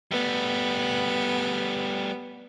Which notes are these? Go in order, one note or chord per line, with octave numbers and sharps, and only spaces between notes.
G3 A3 B3